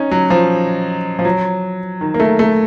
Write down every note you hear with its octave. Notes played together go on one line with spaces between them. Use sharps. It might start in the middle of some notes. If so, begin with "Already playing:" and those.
Already playing: C#4 D#4
F#3
F3
F3
F#3
D#3
A#3
A3
A3